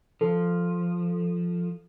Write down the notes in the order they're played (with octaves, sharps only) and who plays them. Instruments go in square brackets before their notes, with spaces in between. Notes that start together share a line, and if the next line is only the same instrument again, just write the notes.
[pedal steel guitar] F3 [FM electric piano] A4